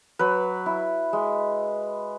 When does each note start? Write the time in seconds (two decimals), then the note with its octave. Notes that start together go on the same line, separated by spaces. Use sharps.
0.19 F#3 B4
0.66 E4
1.13 G#3